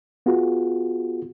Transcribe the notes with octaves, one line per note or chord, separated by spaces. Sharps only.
B3 F4 F#4 G#4